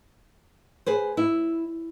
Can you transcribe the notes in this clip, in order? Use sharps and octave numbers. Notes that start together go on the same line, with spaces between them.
G#4 B4 C5
E4